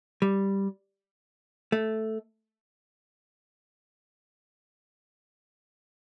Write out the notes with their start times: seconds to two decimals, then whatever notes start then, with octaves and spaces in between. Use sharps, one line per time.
0.22 G3
1.72 A3